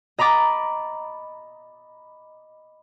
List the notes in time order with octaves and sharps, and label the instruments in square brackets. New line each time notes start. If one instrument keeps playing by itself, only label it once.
[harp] D#5 A#5 B5 D6 A6